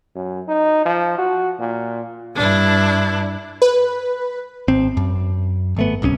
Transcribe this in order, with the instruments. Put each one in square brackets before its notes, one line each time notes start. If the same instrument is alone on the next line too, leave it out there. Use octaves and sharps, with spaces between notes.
[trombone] F#2
D#4
F3
F#4
A#2
[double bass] G2 [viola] D4 E4
[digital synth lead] B4
[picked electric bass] G#1 C4
F#2
G#1 A3 B3
D1 C2 C4 C#4